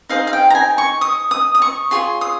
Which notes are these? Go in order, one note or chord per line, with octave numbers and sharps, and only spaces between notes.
D#4 G#4 C5 F5
F5
G5
A#5
G#5
C#6
D#6
D#6
D#6
C#6
F4 G#4 C#5 C6
D#6